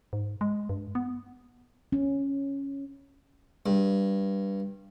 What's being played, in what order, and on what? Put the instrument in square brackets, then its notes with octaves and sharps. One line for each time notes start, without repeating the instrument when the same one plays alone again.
[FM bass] G#2
G#3
G2
B3
[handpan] C#4
[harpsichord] G2